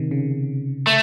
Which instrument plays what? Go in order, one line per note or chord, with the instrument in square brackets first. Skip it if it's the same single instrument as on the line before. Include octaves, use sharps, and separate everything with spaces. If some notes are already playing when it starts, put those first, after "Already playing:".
Already playing: [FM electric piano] C3 D#3
C#3
[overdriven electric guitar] A3